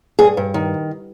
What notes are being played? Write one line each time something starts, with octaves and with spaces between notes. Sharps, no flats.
G2 G#4
G2
D#3